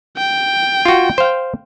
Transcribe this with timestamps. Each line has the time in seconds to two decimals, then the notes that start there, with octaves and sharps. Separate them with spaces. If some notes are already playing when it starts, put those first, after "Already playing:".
0.18 G5
0.85 F4 F#4
1.18 C5 F5